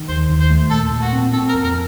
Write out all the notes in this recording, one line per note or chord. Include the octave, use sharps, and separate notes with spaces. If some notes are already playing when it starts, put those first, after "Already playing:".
Already playing: D#3
D#2 C5
D#2
C5
A3
A#2 A4
A#2
F#4
C4
C4 A4
A#4
F2
A#4